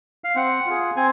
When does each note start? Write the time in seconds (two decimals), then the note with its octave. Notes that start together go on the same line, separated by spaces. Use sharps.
0.24 F5
0.35 C4 F#5
0.66 F4 G#4
0.96 C4 G#5